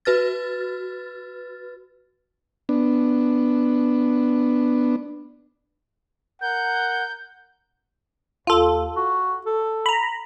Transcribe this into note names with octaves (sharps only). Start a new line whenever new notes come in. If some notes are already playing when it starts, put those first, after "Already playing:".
F#4 B4 F6 A6
B3 D4
A#4 F#5 G6
D#2 F4 A4
F#4
A4
A#5 B5